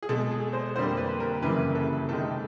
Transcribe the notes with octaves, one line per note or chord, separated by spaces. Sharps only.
G#4
B2 G#3 A4
G#4
C5
F2 D3 G3 A#3 C5
B4
A#4
F#2 C#3 E3 G3 A#3 B4
A4
C3 D#3 G#3 A4